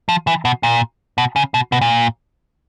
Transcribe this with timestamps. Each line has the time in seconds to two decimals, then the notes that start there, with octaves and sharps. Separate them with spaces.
0.09 F3
0.27 E3
0.45 B2
0.63 A#2
1.18 B2
1.36 C#3
1.54 B2
1.72 B2
1.81 A#2